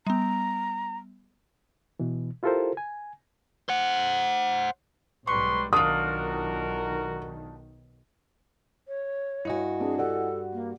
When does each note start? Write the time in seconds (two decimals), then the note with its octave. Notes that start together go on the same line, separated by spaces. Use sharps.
0.07 G3 B3 A#5
2.00 B2 E3
2.43 E4 F4 G4 A4 A#4 C5
2.77 G#5
3.69 C5 F#5
5.27 B1 G#2 G3 B4 C6 C#6
5.73 B1 D#3 D4 F4 F#4 A#4 D#6
8.88 C#5
9.45 G2 E4 F#4 D#5 G#5
9.80 C4 D4 G#4
9.98 G4 A4 D5 F#5
10.53 A#3